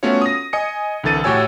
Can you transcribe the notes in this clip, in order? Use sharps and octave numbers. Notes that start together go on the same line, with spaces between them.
A3 B3 C#4 F4 F#4 C#5
D#6 A#6
D#5 G#5 D#6 C#7
C2 D3 E3 A4 A6 D#7
A2 F#4 G4 C#5 G#5 E6